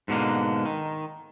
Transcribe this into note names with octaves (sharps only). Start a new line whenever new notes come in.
G#2 B2 D3 A#3
D#3